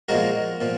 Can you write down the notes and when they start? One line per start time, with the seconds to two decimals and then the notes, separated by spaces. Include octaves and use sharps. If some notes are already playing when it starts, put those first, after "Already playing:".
0.09 A#2 F3 G#3 F#4 A#4
0.61 A#2 F3